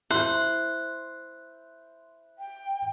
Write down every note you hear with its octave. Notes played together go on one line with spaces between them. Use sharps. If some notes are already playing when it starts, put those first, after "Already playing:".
E4 C5 F#6
G5